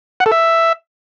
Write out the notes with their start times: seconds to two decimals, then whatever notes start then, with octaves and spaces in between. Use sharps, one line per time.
0.20 F#5
0.26 A4
0.32 E5